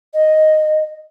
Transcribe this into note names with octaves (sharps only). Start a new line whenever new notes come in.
D#5